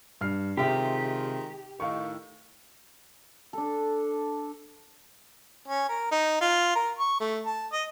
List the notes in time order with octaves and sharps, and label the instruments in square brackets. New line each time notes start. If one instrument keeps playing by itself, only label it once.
[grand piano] G2 F6 C7
[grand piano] C3 E5 [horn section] D#3 G#3 F4 [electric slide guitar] G4
[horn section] A2 D#3 [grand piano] F5 C#6
[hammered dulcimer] D4 A4
[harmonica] C#4
A#4
D#4
F4
A#4
C#6
A3
A5
D#5